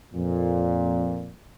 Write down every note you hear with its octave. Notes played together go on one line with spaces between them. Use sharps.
F2 A#2